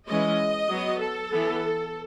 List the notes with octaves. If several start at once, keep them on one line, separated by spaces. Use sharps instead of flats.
E3 G#3 C#4 D#5
F#3 B3
A4
E3 B3